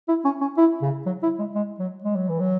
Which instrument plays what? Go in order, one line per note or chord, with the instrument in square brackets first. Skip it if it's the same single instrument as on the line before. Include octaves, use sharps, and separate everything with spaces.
[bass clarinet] E4
C#4
C#4
E4
C#3
F#3
E4
G#3
G#3
F#3
G#3
F#3
E3
F#3